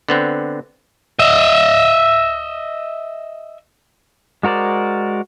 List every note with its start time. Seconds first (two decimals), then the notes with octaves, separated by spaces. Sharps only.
0.08 D3 B3 C4
1.19 D#5 E5
4.43 G#3 F#4 A#4 C5 D5